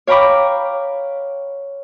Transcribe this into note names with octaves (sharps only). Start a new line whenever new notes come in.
C#5 F5 G5 A#5 B5 D6